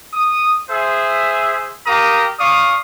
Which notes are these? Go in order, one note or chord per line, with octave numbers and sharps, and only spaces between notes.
D#6
G#4 C5 E5
G4 A#4 F5 A#5 D#6
D5 F5 C#6 D#6